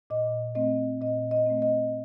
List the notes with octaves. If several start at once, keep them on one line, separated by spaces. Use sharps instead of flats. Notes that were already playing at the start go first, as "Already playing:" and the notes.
A#2 D#5
A3 C4 D#5
A#2 D#5
D#5
A3 C4
D#5